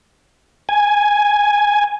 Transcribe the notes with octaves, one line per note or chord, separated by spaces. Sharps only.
G#5